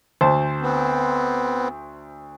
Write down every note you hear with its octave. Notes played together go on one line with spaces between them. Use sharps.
D2 C5 A5
B3 C4